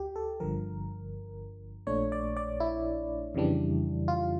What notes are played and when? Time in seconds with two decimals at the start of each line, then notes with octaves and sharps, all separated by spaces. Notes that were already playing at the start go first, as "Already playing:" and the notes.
Already playing: D2 G4
0.16 A4
0.40 G1 G2 D3 F3 A#4
1.87 A#1 A#2 A3 D4 C#5
2.12 D5
2.37 D5
2.60 E4
3.35 F2 C#3 E3 G3 D4
4.08 F4